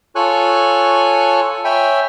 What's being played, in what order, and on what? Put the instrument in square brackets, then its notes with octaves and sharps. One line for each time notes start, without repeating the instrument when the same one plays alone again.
[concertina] F4 A4 C#5 G#5 C#6 F#6
C#5 E5 G5 G#5 B5